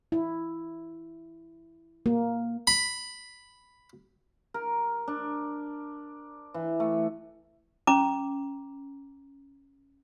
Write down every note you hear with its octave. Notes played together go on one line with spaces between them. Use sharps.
E4
A#3
B5
A#4
D4
E3
A3
C#4 A#5 D6